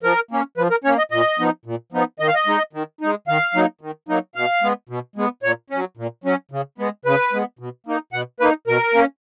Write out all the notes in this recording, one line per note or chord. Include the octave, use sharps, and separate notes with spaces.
F3 A#4
A#3 C#4
F3 B4
A#4
A#3 C#4 C#5
D#5
A#2 D#5
F3 B3 D#4
A#2
F3 B3 D#4
D#3 D#5
F5
D#5
G#3 D#4
D#3
G#3 D#4
D#3 F5
F#3 A#3 D#4
D#3
F#3 A#3 D#4
B2 F5
G#3 B3
B2
G#3 B3
A#2 C#5
F#3 C#4
A#2
F#3 C#4
C#3
G#3 B3
C#3 B4
G#3 B3
B2
A#3 D#4
B2 F#5
A#3 D#4 B4
B2 A#4
A#3 C#4